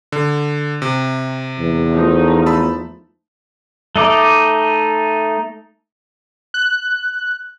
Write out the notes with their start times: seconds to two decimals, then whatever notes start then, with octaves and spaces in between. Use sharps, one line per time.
0.12 D3
0.82 C3
1.59 E2
1.94 F3 A3 D#4
2.46 A5 B5 E6
3.96 A3 D#4 D6
6.54 F#6